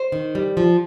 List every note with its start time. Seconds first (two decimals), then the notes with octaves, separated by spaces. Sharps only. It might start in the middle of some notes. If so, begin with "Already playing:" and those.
Already playing: C5
0.12 D#3
0.35 G3
0.57 F3